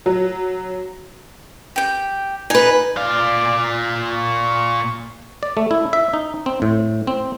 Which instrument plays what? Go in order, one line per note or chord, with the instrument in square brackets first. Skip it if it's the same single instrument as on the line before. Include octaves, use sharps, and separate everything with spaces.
[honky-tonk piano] F#3
[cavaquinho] G4 G5
[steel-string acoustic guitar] D#4 B4 [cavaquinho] G#5
[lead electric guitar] A#2 F5 [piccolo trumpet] D5
[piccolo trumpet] C#6
[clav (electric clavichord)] D5
A3
E4
E5
D#4
C4
A2
C4